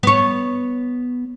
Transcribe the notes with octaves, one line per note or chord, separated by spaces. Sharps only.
B3 C#5